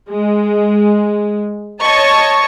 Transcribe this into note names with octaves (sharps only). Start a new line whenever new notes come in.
G#3
C#5 D#5 A5 C#6